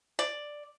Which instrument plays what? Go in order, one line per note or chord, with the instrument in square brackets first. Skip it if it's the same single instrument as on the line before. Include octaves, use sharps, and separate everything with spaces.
[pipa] D5